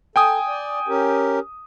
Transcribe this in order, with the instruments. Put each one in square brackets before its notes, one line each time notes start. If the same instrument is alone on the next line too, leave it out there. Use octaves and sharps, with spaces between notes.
[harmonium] A4 [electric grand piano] G5 G#5 D#6
[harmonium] D5
C#4 G4 A#4